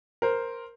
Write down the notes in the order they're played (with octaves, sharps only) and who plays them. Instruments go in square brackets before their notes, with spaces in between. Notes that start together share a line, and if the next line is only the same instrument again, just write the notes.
[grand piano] A#4 C5